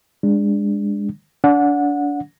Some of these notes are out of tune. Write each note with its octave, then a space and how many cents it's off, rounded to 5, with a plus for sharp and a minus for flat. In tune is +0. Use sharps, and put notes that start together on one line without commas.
G#3 -25 D4 -5
D4 -30 F#5 -25